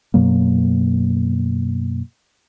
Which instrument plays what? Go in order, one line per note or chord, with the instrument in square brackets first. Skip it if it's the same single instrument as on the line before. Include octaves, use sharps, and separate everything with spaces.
[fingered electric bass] F#2 B2 F#3 A#3